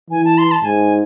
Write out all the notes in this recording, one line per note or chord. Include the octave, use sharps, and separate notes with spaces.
E3 G#5
A5
C6
A5
G#2 G#5